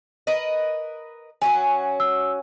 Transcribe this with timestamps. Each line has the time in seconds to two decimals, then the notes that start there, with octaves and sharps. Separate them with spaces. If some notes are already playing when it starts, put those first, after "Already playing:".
0.27 A#4 B4 D#5
1.42 F#3 C#4 F#4 G#5
2.00 E6